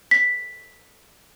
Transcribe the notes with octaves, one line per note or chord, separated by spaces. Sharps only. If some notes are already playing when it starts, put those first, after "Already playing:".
B6